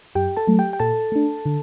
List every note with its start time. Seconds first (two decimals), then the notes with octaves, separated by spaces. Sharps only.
0.15 F#2 G4 G5
0.37 A4 A5
0.47 F#3 A3
0.59 G4 G5
0.73 G5
0.80 A#2 A4 A5
1.12 A3 D4
1.46 D3